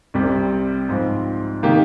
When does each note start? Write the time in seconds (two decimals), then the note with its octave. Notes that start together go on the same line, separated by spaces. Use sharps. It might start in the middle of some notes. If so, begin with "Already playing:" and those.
0.14 C2 C3 G3 C4 G4
0.89 G#2 F3 C4
1.63 C3 D#3 A#3 D#4 G4